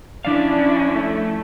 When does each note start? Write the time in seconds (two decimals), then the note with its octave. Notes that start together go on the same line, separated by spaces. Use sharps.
0.25 F3 C#4 D4 E4 D5 F5
0.95 A3